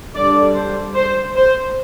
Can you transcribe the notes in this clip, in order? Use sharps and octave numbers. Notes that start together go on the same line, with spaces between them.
D3 G3 D4 D5
C5
C5
C5